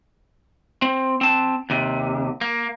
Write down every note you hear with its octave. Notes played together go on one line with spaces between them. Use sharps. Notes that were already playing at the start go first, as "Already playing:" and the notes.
C4
C4 A5
D#2 C3
A#3